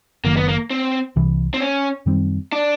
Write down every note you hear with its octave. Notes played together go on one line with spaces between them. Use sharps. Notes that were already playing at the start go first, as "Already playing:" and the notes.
F#1 F#2 D#3 A#3
B3
A#3
C4
C2 C3 E3
C4
C#4
F#2 D#3 G3 C4
D4